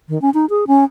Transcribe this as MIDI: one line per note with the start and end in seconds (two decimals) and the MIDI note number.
0.09 0.20 51
0.22 0.30 61
0.34 0.46 63
0.50 0.64 68
0.67 0.84 61